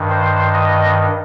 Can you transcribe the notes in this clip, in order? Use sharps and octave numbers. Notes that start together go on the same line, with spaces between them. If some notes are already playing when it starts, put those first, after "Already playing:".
Already playing: G2 D#3
C5
D#5